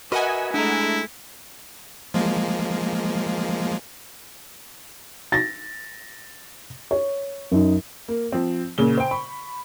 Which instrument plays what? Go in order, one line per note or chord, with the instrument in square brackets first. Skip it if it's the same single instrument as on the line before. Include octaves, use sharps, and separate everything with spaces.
[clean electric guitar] F#4 A#4 B4 [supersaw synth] D#5 F#5 G#5 [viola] E5
[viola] G#3 A3 [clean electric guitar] D4 A#5 [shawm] E4
[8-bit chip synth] F3 G#3 A#3
[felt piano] A6 A#6
C#5
F#2 D#4
[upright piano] A#3
F3 C4
A#2 C#3 G7
C5 G5
B5 C#6